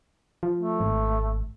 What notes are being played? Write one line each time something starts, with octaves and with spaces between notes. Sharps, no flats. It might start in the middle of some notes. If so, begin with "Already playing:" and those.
F3
A3
G#1